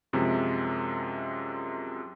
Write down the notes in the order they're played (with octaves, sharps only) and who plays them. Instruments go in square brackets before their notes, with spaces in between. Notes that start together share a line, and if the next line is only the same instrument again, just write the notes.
[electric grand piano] F#2 C3 F3 G#3